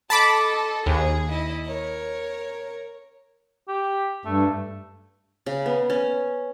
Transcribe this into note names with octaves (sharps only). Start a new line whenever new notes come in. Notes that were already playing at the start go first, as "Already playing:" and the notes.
A4 D#5 A5 B5 D6
D#2 G#4
E4 D#5
A#4 C#5
G4
G2 A3
C#3
B3
C#4